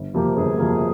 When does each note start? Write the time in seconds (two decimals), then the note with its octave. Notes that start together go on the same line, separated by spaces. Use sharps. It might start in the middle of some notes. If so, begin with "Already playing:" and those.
Already playing: G1
0.14 F2 C3 F3 A#3 G4
0.36 G1 G#4
0.58 F2 C3 F3 A#3